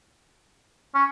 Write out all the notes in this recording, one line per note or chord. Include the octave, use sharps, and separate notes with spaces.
C#4